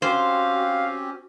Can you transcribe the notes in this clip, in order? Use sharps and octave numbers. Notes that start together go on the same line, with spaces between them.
C4 C#4 F#4 G4 C5 F5